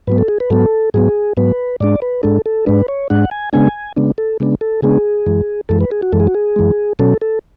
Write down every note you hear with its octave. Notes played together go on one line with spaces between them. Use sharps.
G#2 F#3 B3 B4
A4
G#4
B4
G#2 F#3 B3 A4
G#2 F#3 B3 G#4
G#2 F#3 B3 B4
G#2 G#3 D4 D5
B4
G#2 G#3 D4 A4
A4
G#2 G#3 D4 B4
C#5
G#2 G#3 D4 F#5
G#5
C#3 G#3 B3 D4 G#5
C#3 G#3 B3 D4
A4
C#3 G#3 B3 D4
A4
C#3 G#3 B3 D4 G#4
F#2 E3 G#3
F#2 E3 G#3 A4
B4
G#4
F#4
F#2 E3 G#3 A4
G#4
F#4
G#4
F#2 E3 G#3
B2 F#3 C#4 A4
A4